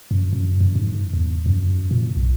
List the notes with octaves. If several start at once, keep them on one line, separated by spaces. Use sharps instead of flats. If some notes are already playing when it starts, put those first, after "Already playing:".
F#2
F#2
F#2
G#2
E2
F#2
A#2
B1